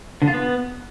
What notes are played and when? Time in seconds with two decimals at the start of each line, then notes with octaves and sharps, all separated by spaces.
0.22 D3
0.28 F4
0.33 B3